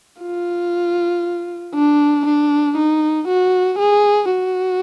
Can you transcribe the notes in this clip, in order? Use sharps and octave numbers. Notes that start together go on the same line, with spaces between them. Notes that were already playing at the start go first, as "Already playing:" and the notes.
F4
D4
D4
D#4
F#4
G#4
F#4